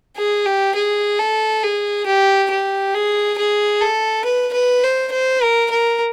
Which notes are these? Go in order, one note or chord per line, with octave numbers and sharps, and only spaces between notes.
G#4
G4
G#4
A4
G#4
G4
G4
G#4
G#4
A4
B4
B4
C5
C5
A#4
A#4